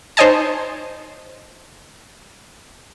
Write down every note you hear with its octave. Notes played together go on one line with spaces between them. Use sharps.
D#4 C5 C#5 D#5 G#5 A5